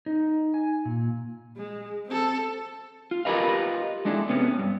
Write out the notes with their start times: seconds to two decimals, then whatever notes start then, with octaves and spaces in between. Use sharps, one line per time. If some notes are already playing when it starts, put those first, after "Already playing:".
0.06 D#4
0.54 G#5
0.85 A#2
1.56 G#3
2.06 C4 A4
3.11 F4
3.25 F4 G4 A#4 B4 D#5 F5
4.05 G#3 A3 D4 E4
4.29 C3 B3 C#4
4.59 G2